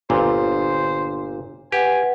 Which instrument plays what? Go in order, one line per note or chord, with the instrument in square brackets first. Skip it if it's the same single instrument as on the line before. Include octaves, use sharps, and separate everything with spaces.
[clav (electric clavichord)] G1 A#2 [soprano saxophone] C5
[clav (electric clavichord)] G4 [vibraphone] B4 F#5 [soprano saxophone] G#5